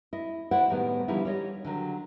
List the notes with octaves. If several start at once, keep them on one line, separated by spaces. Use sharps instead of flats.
E4 D#5
E4 C5 D5 E5 F#5
A2 D#3 G3 G#3 B3
D3 E3 F3 G3 D#4 E4
G3 C#5 D#5
D3 D#3 F#3